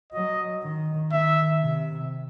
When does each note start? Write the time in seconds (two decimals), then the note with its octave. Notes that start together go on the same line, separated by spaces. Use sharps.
0.13 F#3 D#5
0.63 D#3
1.12 D#3 E5
1.61 C3